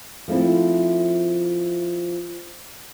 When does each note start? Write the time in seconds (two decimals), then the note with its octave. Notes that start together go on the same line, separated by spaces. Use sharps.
0.28 F3 A3 C4 E4